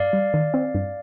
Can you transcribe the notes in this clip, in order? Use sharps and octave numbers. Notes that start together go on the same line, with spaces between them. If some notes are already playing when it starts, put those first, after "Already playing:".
Already playing: G2 D5 F5
G3
D#3
C4
G2